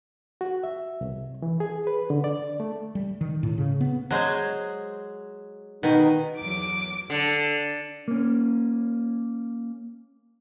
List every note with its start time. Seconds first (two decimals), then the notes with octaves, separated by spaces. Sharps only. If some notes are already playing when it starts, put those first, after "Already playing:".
0.41 F#4
0.63 E5
1.01 C2
1.42 E3
1.60 G#4
1.87 B4
2.10 D3
2.24 D5
2.60 A3
2.95 G3
3.21 D#3
3.43 A2
3.58 C#3
3.81 B3
4.11 F#3 G#3 C5
5.83 B2 D#3 D#4
6.38 E2 F#3 D6 D7
7.10 D3
8.08 A#3 C#4